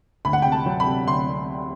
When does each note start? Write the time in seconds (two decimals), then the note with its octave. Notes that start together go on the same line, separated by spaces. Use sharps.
0.25 D2 B5
0.33 F#5
0.42 C3 G5
0.52 A5
0.66 F#3
0.80 B5
0.86 C3
1.06 D2 C6